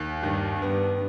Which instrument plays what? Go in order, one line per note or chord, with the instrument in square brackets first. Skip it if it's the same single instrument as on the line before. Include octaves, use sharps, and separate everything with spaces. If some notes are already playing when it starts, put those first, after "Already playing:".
Already playing: [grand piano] D#2
[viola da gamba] G2 [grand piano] D#3
[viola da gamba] G2 [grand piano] B3